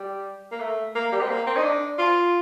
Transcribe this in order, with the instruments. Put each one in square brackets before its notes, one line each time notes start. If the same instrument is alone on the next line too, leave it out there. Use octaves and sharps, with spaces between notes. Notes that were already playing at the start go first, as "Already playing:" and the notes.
Already playing: [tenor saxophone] G3
A#3
A3
A#3
G3
C4
A#3
C4
D#4
D4
F4